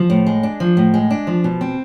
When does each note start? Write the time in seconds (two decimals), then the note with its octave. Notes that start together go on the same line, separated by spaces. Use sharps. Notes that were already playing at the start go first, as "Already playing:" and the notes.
Already playing: F3
0.10 A2
0.27 G#3
0.43 D4
0.60 F3
0.77 A2
0.94 G#3
1.10 D4
1.27 F3
1.44 B2
1.61 C4